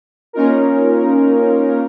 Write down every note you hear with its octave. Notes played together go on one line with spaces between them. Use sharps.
A#3 C#4 D#4 F4 A#4